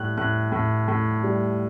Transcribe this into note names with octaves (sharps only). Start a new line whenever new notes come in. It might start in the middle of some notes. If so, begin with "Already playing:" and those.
Already playing: A2 G3 F#6
A2 F#6
A2
A2
G3